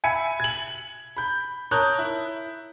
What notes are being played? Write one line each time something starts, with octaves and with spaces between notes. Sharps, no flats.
E5 G#5 B5 G#6 C#7
G#6 F#7
B5 G6
A#4 C#5 A5 D#6 F#6 G6
E4